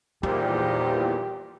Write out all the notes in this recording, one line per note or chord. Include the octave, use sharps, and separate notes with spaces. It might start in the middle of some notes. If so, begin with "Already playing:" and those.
E2 A#2 D#3 F3 G3 F4 G4